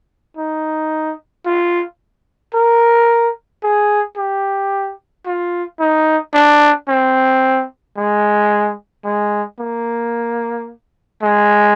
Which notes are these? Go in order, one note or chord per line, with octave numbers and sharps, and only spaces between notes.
D#4
F4
A#4
G#4
G4
F4
D#4
D4
C4
G#3
G#3
A#3
G#3